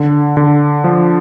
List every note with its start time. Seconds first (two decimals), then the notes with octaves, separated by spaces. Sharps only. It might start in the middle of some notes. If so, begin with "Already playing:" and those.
Already playing: D3
0.37 D3
0.84 F3